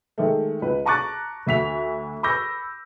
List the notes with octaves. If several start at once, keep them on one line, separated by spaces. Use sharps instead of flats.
D#3 G#3 A3
C#2 B4
A5 A#5 C#6 D6 F#6 A6
D2 E5 B6 F7
B5 C#6 D6 E6 G6 A#6